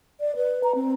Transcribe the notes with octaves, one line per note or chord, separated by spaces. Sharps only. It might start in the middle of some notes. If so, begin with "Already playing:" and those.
D5
B4
A#5
C4